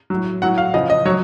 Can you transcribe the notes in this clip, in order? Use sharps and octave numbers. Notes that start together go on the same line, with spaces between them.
A2 F#3
A2 F#3 F#5
F5
C#3 F3 D#5
D#5
F#3 C#5